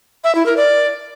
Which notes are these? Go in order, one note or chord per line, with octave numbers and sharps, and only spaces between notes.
E5
E4
A#4
D5